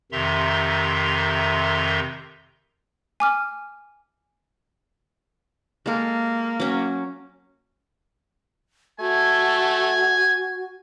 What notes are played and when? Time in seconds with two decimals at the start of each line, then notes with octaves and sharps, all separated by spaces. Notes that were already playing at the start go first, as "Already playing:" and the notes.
0.12 F2 C3 D#3 E5 A#5 C6
3.20 G#5 D6 F6
5.86 G#3 A#3 A4
6.60 F#3 C#4
9.00 A3 F#4 G#5